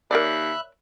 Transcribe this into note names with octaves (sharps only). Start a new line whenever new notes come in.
D#2 A#4 C#5 D5 E5 B5 F#6